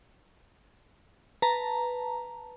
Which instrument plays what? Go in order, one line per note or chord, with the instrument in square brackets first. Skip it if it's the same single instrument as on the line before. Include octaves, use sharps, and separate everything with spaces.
[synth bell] B4 A5 A#5